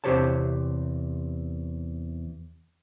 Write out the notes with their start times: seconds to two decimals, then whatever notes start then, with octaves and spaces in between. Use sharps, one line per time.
0.04 E2 C3 G4 C5 C#5 A5